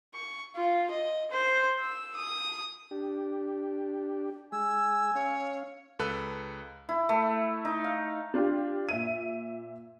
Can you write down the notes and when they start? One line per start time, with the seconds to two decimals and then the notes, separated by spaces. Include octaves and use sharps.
0.14 C#6
0.55 F4
0.90 D#5
1.31 C5
1.79 E6
2.16 D#6
2.91 D4 G4
4.52 G#3 G#5 E6
5.15 C#4 C#5 F5
5.99 C#2 A4 B4 F#6
6.89 E4
7.09 A3
7.65 D#4
7.84 F5
8.34 D4 F4 G4
8.89 A#2 E5 D#7